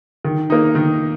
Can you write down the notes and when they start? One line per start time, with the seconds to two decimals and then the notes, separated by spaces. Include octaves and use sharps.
0.25 D#3
0.50 A#3 D#4
0.75 D#3